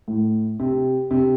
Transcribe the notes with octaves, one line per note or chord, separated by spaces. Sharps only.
A2
C3
C3